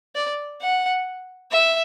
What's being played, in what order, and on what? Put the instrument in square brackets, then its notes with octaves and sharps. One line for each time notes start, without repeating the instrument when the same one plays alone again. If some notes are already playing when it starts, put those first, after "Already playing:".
[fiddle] D5
F#5
E5